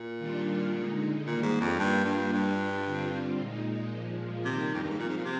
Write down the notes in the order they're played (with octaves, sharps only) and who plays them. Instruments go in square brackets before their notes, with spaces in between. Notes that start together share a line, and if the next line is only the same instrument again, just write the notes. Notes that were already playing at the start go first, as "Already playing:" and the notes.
Already playing: [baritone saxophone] A#2
[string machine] D#3 G3 D4 F4
D3 G#3 D#4
[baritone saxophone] A#2 [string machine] D#3 G3 A#3
[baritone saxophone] G#2
F2
[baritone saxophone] G2 [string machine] G3 A#3 D4 F4
[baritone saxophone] G2
[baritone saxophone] G2 [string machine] G3 D4 F4
[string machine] D3 G3 C4 F4
A#2 G#3 D#4
A#2 F3 G#3
[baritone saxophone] C3 [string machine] D#3 G3 A#3 D#4
[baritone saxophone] F2
G2
G#2
[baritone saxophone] A#2 [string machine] F3 C4 F4
[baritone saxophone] G#2
A#2
C3